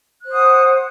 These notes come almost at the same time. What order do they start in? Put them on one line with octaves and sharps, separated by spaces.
F#6 C5 D#6 F#5